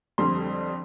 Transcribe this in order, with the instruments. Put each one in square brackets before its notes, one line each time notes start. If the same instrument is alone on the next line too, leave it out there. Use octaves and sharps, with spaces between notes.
[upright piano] F2 D3 G3 C6